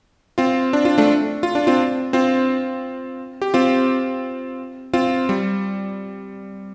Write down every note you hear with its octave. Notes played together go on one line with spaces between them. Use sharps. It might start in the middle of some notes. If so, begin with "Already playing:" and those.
C4 F4
D4
F4
A3 D4
F4
D4
C4 F4
C4 F4
G4
C4 F4
C4 F4
G3